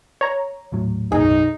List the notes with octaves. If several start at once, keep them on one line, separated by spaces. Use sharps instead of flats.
C#5 A#5
D#1 A2 F#3
B1 F#2 D#4 G#4